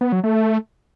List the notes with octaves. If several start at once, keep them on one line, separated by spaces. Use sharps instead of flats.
B3
F#3
A3